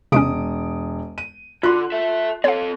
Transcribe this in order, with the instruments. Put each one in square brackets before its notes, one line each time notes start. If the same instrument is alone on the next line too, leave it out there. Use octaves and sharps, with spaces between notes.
[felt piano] E1 D#6 D7 [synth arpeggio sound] C3 G#3 C#4
[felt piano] D#7
[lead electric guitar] D3 [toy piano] F4 [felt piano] C6 F#6
[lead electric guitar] A4 E5
[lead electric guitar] C4 A4 [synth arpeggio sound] C#5 F5